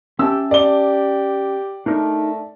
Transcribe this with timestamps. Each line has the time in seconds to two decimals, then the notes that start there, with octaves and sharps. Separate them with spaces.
0.19 C#4 G4 E5 A5 E6
0.51 G4 D5 G7
1.86 A3 D4 D#4 A#4